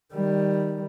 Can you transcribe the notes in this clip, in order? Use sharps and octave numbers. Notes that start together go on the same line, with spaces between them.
D#3 G3